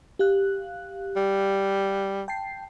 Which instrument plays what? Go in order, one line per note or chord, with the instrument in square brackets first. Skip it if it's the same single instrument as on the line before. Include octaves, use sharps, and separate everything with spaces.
[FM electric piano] G4 F5 F#6
[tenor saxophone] G3
[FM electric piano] G5 A5 C7